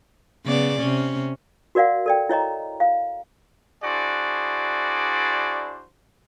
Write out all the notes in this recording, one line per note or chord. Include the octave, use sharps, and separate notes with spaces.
C#3 B3 D5
C3 C#4
F#4 A#4 D5 F5 F#5
A4 D5 G5
E4 C#5 D#5 A#5
F5
D4 E4 F#4 G#4 C5 D5